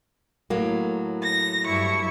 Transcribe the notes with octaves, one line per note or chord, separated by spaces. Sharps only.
A2 F#3 A#3
A#6
G2 E4 C#6